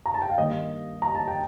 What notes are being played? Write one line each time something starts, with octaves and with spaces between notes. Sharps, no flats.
A#5
A5
G5
F5
G2 D#3 A#3 D#5
A#5
A5
G5